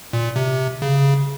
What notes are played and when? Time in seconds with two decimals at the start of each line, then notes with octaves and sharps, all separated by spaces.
0.13 A#2
0.36 C3
0.82 C#3